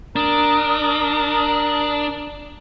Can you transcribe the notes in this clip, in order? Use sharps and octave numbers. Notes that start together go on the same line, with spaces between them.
D4 A#4 D#6